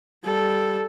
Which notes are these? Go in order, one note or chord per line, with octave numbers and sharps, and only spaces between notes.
G3 A4